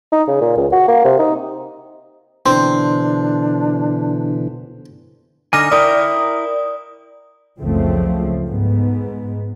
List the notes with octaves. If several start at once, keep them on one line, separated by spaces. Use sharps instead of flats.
D#4
C#3
A#2
C#2
F#4
A#3
C3
D#4
B2 D3 E3 C4 D4 C6
D3 D#4 G#5 D6 F6 A#6
E4 A#4 D5 G5 D#6
F#1 C#2 C#3 F3 A3 C4
G#2 B3